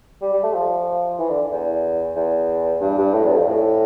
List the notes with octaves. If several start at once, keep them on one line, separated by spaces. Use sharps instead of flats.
G3
G3
A3
F3
E3
D3
E2
E2
G2
G2
A2
E2
F2
A2